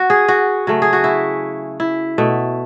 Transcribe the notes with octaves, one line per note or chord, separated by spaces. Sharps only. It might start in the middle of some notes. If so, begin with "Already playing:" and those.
Already playing: F#4
G#4
F#4
C#3 F#3 A3
G#4
F#4
E4
E4
B2 A3